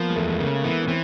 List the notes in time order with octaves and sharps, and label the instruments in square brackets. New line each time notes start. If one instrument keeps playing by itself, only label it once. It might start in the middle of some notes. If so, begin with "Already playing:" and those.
Already playing: [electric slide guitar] F3 [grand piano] A#3 B3
[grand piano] G#3
[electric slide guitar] E2 [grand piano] A3
[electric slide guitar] C#3 [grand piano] A#3
[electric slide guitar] E3 [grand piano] B3
[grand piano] C#4
[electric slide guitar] E3 [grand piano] C4